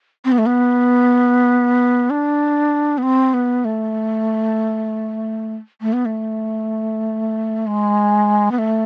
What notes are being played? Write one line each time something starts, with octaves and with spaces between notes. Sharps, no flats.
C4
B3
A3
B3
D4
B3
C4
B3
A3
A3
B3
A3
G#3
B3
A3